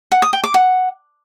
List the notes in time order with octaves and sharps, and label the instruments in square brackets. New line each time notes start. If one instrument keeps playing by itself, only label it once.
[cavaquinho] F#5
D#6
G5
D6
F#5